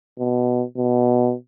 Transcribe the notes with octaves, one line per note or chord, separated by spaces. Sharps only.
B2
B2